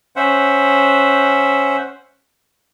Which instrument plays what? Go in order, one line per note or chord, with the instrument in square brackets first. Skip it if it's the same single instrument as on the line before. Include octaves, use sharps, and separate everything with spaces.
[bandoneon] C#4 C5 E5 F#5